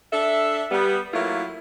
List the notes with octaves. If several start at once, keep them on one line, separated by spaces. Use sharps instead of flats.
D4 A4 E5
G3 B3
F#3 A3 A#3 E4 F4